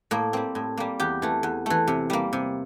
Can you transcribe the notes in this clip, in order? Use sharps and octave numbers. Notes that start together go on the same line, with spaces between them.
A2 A#3
G3 A#3 C4
A2
G3 A#3
E2 G4
E3 A3
E2
E3 A3
C3
G3 A#3
C3